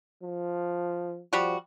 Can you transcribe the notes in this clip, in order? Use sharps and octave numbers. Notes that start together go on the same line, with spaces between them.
F3
F3 G3 F#4